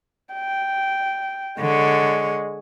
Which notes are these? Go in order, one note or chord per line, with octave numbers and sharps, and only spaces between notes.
G5
D3 G#3 C#5